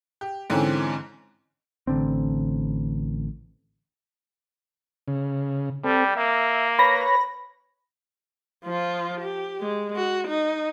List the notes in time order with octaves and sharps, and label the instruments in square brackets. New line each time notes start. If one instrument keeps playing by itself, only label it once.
[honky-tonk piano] G4
G#2 D3 E3 C4 C#4
[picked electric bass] A1 D3 C4
[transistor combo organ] C#3
[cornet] G3 [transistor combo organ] C4 A4
[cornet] A#3 [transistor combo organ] E5
[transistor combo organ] B4 C#5 [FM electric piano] B5 A#6
[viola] F3 F4
G4
G#3
F#4
D#4